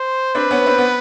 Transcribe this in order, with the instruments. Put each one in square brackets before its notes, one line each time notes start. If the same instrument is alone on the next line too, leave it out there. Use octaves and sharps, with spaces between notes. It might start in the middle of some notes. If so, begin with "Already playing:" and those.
Already playing: [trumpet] C5
[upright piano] C4 D4 [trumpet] B4
[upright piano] B3 C#4
C4
B3